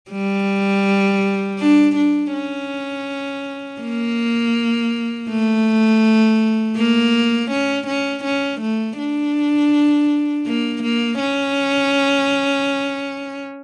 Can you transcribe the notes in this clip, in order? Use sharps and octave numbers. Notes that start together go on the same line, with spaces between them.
G3
D4
D4
C#4
A#3
A3
A#3
C#4
C#4
C#4
A3
D4
A#3
A#3
C#4